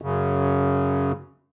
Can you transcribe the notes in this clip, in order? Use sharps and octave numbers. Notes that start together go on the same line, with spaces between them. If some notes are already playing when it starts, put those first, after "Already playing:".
F#2 C#3